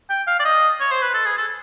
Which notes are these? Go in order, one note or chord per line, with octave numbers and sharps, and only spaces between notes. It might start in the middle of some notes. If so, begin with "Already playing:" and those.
G5
F5
D5
D#5
C#5
C5
B4
A4
G#4
A4